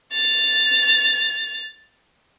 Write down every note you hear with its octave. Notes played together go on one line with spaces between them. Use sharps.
A6 F7